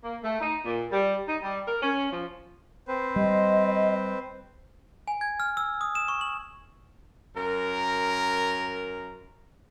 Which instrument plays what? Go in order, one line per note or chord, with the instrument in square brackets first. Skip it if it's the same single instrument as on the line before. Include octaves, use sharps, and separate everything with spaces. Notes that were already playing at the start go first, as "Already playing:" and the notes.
[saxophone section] A#3
A3
D#4
A#2
G3
D#4
G3
A#4
C#4
F3
[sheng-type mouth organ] C4 B4 C5
[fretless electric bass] G3 [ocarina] D#5
[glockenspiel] G#5
G#6
F6
E6
D#6
E7
C#6
F#7
[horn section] F#2 A#4